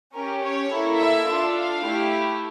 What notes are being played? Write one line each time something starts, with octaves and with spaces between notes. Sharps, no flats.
C#4 G4 A#4
C#5
A#3 E4 A4
E5
D4 F4 A4
F5
A3 E4 G4